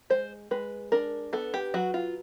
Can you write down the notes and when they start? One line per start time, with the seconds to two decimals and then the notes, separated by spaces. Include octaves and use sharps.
0.10 G#3 C5
0.51 G#3 B4
0.92 D4 A#4
1.33 B3 A4
1.54 G4
1.74 F#3 F#4
1.94 F4